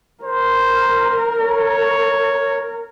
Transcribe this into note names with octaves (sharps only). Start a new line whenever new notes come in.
A#4 C5
C#5